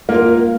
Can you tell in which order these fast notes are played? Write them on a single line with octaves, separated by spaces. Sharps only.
A#3 F4 A#4